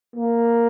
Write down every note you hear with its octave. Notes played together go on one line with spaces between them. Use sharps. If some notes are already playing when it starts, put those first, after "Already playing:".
A#3